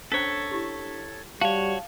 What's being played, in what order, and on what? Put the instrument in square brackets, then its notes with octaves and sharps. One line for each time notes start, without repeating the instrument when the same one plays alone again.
[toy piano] C#4 C5 A#5 [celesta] D4 B6 [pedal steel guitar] A4 C#5
[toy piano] E4 G4
[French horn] G3 [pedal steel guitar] F#4 C#5 [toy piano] F5 [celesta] A5